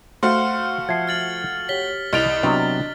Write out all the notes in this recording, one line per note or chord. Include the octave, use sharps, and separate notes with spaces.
A3 F#4 C5 F5 C6 F6 C#7
F3 E5 G#6 C7
F6 A6 F#7
G4 C#5 B6 G7
C2 D#5 F6 A6 D7 F7 G7
C3 F#3 B3 D4